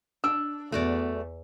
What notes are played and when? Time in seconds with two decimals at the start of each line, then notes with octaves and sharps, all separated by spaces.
0.24 D4 E6
0.72 E2 A3 F#4 D5